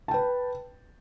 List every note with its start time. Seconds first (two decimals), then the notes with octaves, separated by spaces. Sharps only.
0.08 A5
0.11 G5
0.14 B4